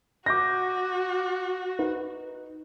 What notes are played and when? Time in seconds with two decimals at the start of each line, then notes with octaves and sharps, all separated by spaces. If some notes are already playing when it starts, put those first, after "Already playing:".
0.26 F#4 D6 G6 A#6
1.79 D#4 B4